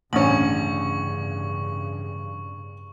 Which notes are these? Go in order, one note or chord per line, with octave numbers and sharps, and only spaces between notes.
A1 D2 G2 C#3 C#4 C#6 F#7